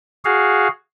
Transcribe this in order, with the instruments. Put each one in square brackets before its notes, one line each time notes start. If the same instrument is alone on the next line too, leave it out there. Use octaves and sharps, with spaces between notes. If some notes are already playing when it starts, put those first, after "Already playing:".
[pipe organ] F#4 G#4 F5